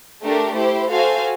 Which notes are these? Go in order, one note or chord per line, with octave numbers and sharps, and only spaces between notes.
A3 D4 G4 A#4
E4 G4 C5
F#4 A4 C5 F5 G#5